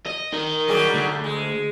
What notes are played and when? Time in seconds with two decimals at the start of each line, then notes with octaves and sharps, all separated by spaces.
0.07 D#5
0.34 D#4 A#4
0.68 F#3 G3 G#4
0.95 D2
1.24 G#3